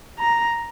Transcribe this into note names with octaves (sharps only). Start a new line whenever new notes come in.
A#5